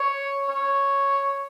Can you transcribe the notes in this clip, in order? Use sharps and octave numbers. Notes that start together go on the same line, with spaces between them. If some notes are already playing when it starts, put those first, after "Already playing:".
Already playing: C#5
C#5